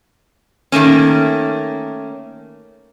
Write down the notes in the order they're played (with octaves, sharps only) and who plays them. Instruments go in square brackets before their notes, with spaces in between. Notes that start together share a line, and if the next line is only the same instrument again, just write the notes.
[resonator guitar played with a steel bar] D#3 A3 A#3 C#4